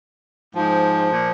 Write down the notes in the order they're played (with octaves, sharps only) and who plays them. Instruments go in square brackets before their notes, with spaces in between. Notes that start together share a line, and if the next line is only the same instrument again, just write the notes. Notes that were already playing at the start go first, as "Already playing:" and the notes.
[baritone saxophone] G#2 [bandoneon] F3
[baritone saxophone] A#2